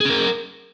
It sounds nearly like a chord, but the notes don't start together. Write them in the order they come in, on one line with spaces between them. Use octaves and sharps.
G#4 C#4 A#4